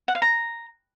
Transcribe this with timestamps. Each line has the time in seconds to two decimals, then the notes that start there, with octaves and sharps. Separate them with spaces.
0.08 F#5
0.15 F5
0.22 A#5